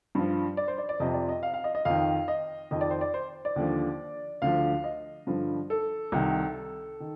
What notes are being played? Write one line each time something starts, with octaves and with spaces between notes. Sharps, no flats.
G2 F3
D5
C5
D5
D5
F2 C3 F3 D#5
D5
D#5
F5
F5
D#5
D#5
F2 D#3 F5
D#5
F2 D#3 D#5
D5
C5
D5
C5
D5
D#2 D3 F3
D2 D3 F3 F5
D#5
G2 D3 F3
A4
C2 C3 D#3
D#3